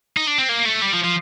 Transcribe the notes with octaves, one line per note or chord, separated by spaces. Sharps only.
D#4
D4
C4
A#3
A3
G3
F3
F3